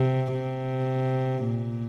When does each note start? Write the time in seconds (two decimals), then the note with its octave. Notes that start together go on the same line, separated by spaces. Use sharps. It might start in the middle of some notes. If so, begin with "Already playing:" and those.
Already playing: C3
0.32 C3
1.44 A#2